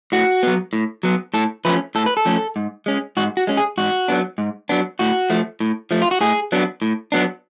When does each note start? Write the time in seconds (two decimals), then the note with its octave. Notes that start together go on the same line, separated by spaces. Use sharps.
0.12 A2 F#4
0.43 F#3 B3
0.73 A2
1.03 F#3 B3
1.34 A2 A4
1.65 F3 A3 C#4 B4
1.95 A2 A4
2.06 B4
2.17 A4
2.25 F3 A3 C#4
2.56 G#2
2.86 G#3 C#4
3.17 G#2 F#4
3.37 F#4
3.47 G#3 C#4
3.57 G#4
3.78 G#2 F#4
4.08 F#3 B3 D4
4.38 G#2
4.69 F#3 B3 D4
4.99 A2 F#4
5.30 F3 A3
5.60 A2
5.91 F3 A3
6.02 F4
6.11 F#4
6.21 A2 G#4
6.52 F#3 B3 D4
6.82 A2
7.12 F#3 B3 D4